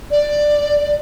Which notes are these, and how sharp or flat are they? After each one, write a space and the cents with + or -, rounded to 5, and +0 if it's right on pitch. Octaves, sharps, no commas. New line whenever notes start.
D5 +10